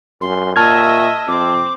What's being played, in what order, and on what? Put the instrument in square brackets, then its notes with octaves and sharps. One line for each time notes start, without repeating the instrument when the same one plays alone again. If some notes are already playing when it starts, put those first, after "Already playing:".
[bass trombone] F#2 [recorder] C6
[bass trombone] A#2 [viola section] D#5 E5 [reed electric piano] A5 F6 G#6 [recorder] C#6
[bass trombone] F2 [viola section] C4 [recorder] D6